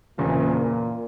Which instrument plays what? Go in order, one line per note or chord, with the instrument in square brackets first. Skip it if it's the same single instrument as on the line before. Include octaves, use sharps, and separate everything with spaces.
[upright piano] F#1 E2 C#3 E3 [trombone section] A#2